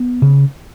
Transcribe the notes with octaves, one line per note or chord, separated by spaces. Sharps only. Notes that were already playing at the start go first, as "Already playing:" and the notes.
Already playing: B3
C#3